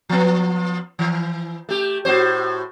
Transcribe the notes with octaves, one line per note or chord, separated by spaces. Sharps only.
F3 B3
E3
A3 G4
A2 F#4 C5